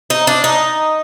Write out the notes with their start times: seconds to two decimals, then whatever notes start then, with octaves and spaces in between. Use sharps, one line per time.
0.10 D#4
0.27 D4
0.44 D#4